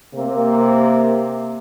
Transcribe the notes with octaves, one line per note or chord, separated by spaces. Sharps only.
C3 A#3